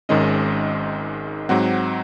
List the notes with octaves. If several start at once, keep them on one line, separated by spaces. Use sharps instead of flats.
G#1 G#2 D#3 G#3 C#4 D#5
G#2 F#3 C4 F#5